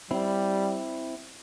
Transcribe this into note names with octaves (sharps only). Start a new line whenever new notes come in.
G3 C4 E4